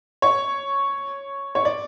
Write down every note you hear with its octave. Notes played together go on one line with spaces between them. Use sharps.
C#5
C#5
D5